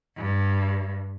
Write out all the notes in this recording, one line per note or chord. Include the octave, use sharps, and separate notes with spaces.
G2